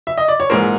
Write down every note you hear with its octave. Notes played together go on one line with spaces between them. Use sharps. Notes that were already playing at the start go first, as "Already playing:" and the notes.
E5
D#5
D5
C#5
A#1 G#2 E3 A#4 C5